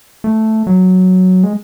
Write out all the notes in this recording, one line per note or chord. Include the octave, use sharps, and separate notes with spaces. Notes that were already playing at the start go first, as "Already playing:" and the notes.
A3
F#3
G#3